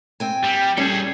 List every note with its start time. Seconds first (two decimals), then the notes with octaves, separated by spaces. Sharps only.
0.20 C4 G5 G#5
0.43 G3
0.77 G3 C#4 G#4 A4